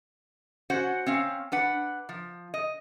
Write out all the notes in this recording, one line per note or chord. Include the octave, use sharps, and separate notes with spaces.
C#4 F#4 C5 F#5
C4 C#4 F5
D4 B4 F#5
F3
D#5